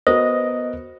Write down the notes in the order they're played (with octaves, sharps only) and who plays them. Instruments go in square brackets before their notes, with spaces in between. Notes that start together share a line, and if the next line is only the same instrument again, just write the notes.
[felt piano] B3 F#4 A#4 [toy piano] C5 [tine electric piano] D#5